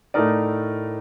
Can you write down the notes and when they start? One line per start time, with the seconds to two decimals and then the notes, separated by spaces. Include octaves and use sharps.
0.14 A2 A3 D#4 A#4 D5